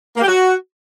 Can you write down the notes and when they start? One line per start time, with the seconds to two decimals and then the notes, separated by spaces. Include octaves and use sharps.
0.16 A#3
0.22 G4
0.27 F#4